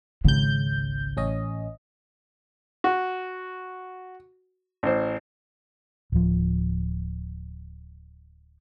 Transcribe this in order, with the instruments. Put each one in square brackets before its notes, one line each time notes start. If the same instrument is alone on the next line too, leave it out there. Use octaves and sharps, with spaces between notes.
[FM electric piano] G#1 C#2 G6 [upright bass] C#3
[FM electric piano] A1 C#4 D#5
[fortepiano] F#4
A1 C5
[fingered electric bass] D1 F3